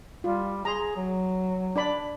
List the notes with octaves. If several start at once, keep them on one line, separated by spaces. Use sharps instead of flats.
G3 F4
G#4 A#5 C6
F#3
D4 D5 B5